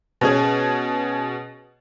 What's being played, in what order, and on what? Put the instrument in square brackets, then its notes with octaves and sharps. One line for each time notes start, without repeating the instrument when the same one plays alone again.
[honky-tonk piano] B2 C#4 G#4